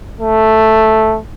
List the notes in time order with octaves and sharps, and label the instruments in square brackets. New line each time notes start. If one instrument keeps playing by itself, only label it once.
[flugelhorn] A3